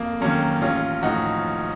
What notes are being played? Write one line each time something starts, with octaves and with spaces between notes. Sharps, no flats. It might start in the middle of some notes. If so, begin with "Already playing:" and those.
Already playing: F2 A#3
D#3 F#3 A#3 C#4
A1 C#4 F4
A2 F3 D#4 F#4